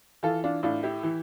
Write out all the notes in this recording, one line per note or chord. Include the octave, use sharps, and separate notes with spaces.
E3 F4 A4
D4 F4
A2 D4 F4
E4 G4
E3